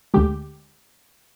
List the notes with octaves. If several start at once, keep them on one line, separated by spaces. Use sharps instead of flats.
D2 D3 G#3 G4